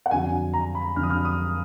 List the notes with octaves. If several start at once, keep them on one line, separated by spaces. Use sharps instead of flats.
F#5
F2 D3 F#3 D4 G#5
A#5
B5
F2 D3 F#3 D4 F6
D#6
F6
D#6